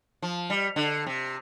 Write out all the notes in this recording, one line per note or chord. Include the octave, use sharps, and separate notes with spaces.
F3
G3
D3
C3